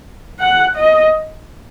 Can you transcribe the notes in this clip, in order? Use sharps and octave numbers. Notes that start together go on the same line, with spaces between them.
F#5
D#5